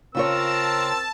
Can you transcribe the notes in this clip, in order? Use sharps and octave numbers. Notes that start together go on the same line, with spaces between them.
C#3 C4 F4 A#4 C#5 A5 E6